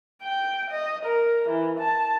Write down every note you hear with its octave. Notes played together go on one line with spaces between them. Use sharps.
G5
D#5
A#4
E3
A5